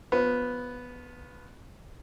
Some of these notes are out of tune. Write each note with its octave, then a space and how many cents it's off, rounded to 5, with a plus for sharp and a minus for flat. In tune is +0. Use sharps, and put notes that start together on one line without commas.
F3 +25 B3 +0